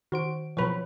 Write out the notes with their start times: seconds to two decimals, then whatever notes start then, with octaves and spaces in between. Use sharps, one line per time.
0.12 D#3 F#4 C5 D7
0.57 B2 F3 F#3 B4 C#5